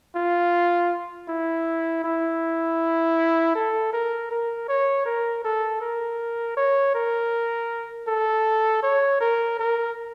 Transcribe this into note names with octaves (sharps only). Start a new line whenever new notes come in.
F4
E4
E4
A4
A#4
A#4
C#5
A#4
A4
A#4
C#5
A#4
A4
C#5
A#4
A#4